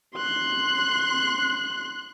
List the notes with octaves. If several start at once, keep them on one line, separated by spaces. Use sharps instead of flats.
C6 F#6